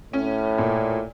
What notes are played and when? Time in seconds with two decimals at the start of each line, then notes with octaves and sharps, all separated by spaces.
0.13 A2 C#4
0.58 A#2